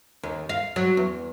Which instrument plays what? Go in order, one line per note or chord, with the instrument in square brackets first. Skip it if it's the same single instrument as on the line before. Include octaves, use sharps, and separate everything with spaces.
[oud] D#2
F5
F#3
E2